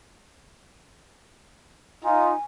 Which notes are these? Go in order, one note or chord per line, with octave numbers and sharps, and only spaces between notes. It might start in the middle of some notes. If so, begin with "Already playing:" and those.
D#4 F4 G#5